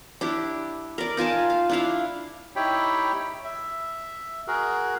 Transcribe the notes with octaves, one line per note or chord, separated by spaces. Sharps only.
D4 E4 G4
A#4 D5
D#4 F4 G#5 A5
F5
D4 E4 F5
D#4 E4 G4 C#5 G5 B5
E5
F#4 G#4 A#4